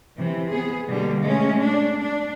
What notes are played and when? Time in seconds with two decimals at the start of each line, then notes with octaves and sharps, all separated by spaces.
0.18 C3 E3
0.51 B3 G#4
0.87 B2 D3 G3 A#3
1.20 G#3 A3 C#4
1.62 D4
2.00 D4